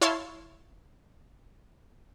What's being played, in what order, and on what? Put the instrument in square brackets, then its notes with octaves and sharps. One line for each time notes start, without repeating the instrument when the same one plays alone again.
[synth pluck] E4 C#5 E5 F5 A5 C6